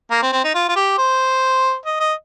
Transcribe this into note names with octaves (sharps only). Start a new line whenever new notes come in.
A#3
C4
C4
D#4
F4
F4
G4
C5
D#5
D#5